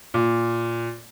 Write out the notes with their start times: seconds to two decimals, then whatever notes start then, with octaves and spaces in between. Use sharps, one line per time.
0.14 A#2